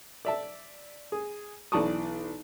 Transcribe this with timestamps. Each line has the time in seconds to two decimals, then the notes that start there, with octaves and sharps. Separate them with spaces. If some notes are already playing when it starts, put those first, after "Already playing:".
0.25 D5 E5 A5
1.12 G#4
1.72 B1 E3 D5 A5 C#6 D#6